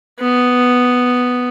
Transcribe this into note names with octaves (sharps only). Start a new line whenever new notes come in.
B3